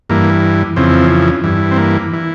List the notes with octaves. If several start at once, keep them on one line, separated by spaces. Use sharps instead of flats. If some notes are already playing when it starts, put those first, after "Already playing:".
G2 E3 A#3
F2 C#3 E3 C4
G2 E3
C4
A#3
E3